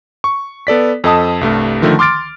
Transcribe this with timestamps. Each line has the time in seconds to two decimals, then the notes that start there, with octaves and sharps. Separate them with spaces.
0.24 C#6
0.67 B3 A4 D5 B6
1.04 F2 A4 D#5 A5 D#6
1.41 C2 G2 A3
1.82 D3 D#3 F3 A3
1.99 C6 D6 F6 A6 D7